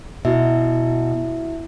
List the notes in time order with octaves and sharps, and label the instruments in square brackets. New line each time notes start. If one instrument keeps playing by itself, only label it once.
[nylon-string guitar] B2 [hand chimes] E4 F#4 E5